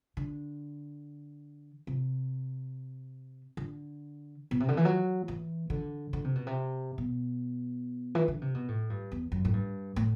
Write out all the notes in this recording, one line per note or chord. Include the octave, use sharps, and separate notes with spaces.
D3
C3
D3
B2
C3
D3
E3
F#3
E3
D3
D3
C3
B2
C3
B2
E3
D3
C3
B2
A2
G2
E2
F#2
A2
G2
A2